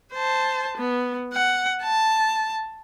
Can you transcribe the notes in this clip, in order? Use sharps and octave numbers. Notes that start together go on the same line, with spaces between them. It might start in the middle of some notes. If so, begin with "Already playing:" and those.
C5 A5
B3
F#5
A5